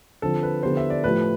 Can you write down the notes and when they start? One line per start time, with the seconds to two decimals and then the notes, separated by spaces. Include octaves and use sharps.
0.22 D3 F3 C4 A4
0.43 B4
0.63 D3 F3 B3 E4 G4 C5
0.77 E5
0.90 D5
1.04 A2 F3 A3 E4 G4 B4